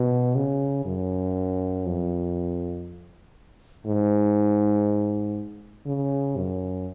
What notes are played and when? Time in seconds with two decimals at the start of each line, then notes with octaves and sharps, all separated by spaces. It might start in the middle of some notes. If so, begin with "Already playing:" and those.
Already playing: B2
0.35 C#3
0.86 F#2
1.86 F2
3.87 G#2
5.86 C#3
6.37 F#2